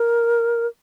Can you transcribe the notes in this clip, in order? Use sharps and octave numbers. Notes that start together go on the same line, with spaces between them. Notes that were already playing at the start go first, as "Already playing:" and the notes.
Already playing: A#4